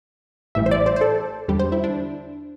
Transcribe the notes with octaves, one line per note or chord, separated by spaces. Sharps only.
A1 A2 E3 G3 E5
C5
D5
C5
C5
A4
E2 D3 G3 G4
C5
E4
D4